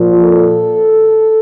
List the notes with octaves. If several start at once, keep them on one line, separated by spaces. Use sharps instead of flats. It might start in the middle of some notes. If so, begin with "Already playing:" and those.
Already playing: A#2 F3
A4